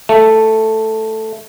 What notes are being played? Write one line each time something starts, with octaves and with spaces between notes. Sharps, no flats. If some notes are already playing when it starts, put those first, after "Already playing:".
A3